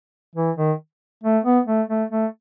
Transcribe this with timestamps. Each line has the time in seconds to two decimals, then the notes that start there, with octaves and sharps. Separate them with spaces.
0.36 E3
0.57 D#3
1.23 A3
1.44 B3
1.67 A3
1.89 A3
2.11 A3